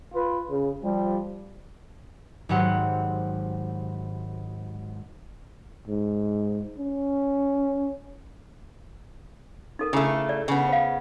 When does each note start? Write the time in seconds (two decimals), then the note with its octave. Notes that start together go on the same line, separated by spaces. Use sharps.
0.13 F4 B4
0.50 C#3
0.83 F3 G3
2.49 G#1 G#2 F#3 G4 C5 F#5
5.88 G#2
6.78 C#4
9.79 D#4 A4 A#4
9.93 C#3 A3 E4 G#4
10.29 D5
10.48 C#3 B3
10.68 C5 F5